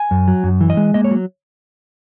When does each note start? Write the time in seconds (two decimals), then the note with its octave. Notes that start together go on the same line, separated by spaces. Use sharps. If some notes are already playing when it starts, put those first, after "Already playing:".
Already playing: G#5
0.11 F#2
0.28 F#3
0.44 F#2
0.61 E3
0.70 D#5
0.77 G#3
0.94 A#3 D#5
1.04 C#5
1.11 F#3